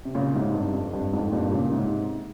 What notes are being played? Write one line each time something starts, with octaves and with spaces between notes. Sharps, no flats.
C3
A#2 C#3
G#2 C3
G2
F2
G2
F2 G#2
G2 A#2
A#2 C#3
G#2 C3